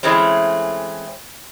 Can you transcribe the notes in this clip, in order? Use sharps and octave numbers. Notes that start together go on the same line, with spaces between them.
E3 G#3 A3 C4 C#4